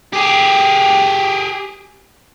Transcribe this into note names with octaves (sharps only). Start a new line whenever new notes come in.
G4 G#4